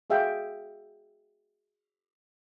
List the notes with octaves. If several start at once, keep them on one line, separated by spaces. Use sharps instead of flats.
F#4 G#4 E5 F5 G5